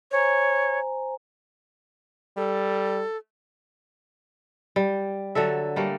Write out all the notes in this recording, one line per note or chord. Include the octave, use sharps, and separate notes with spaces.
C5 C#5 G#5 A#5
G3 A4
G3
D3 F#3 A4 E5
G3 A3 A#3